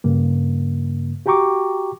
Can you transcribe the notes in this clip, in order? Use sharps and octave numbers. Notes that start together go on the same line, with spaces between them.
G2 C#3 A#3
F#4 G4 G5 A#5 C#6 D6